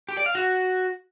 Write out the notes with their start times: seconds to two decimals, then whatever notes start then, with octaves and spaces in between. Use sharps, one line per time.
0.09 G4
0.17 D5
0.26 F5
0.35 F#4